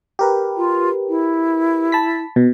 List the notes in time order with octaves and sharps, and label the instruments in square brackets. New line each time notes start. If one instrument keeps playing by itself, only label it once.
[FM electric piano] G4 A#4 B4
[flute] F4
E4
[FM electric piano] A5 B5 B6
B2